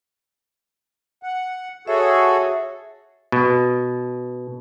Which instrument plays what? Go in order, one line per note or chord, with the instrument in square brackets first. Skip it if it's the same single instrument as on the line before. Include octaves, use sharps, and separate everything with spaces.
[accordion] F#5
[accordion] F#4 G#4 A4 [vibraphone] C#5 E5
[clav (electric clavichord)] B2